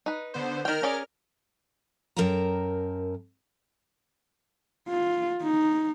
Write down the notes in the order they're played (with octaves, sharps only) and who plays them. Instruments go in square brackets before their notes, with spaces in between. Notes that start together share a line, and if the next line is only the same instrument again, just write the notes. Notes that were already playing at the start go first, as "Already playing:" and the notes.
[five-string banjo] D#4 B4
[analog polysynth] D3 B3 C5
[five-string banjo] D#3 G5 [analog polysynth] A#4 F6
[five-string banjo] C#4 G#4 D5
[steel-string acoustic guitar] F#2 A#4 G5 A5 A#5
[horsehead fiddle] F4
D#4